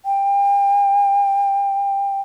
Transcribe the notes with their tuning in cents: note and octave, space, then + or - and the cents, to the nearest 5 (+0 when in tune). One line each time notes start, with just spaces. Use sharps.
G5 +35